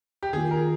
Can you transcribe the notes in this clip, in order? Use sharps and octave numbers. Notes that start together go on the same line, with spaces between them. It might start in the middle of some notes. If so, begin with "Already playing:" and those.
G4
D#3 A#3 F4 G#4
A#4